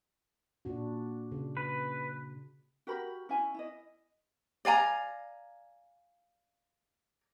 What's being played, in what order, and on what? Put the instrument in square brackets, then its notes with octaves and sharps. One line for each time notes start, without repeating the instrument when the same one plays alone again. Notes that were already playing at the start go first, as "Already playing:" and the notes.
[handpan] A#2 D4 F#4
C#3
[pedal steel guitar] B4
[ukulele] F#4 G4 A#4 B5
C#4 E4 E5 G#5
E4 D#5
D5 F5 G#5 A#5